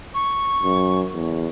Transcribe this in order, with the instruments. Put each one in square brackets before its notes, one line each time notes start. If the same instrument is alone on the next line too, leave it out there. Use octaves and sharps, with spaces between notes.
[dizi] C#6
[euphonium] F#2
E2